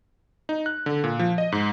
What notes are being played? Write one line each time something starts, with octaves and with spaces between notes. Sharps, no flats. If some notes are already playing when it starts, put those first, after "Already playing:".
D#4
F#6
D3
A#2
F3
D#5
G#2